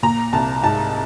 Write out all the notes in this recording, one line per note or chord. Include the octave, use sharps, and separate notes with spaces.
A#2 A#5
C2 A5
G#2 A5